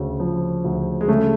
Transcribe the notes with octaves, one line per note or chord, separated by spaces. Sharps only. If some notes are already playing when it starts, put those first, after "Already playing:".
Already playing: D2 C#3
F3
D2
G#3
C#3 A3